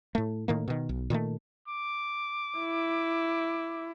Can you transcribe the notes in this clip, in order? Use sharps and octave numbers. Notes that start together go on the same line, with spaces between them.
A2 A3
A2 D#3 A#3
B2 D#3
B1
A#2 D#3 G3 A3
D6
E4